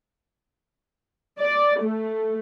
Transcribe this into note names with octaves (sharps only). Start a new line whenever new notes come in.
D5
A3